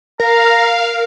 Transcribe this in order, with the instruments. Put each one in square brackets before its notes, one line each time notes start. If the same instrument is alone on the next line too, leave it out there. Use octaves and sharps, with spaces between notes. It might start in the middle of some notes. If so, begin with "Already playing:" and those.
[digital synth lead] A#4 [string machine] F5 [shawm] A#5